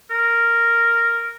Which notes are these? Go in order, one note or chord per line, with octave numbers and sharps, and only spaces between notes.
A#4